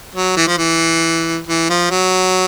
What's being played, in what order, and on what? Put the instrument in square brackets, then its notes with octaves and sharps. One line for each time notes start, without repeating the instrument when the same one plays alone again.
[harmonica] F#3
E3
F3
E3
E3
F3
F#3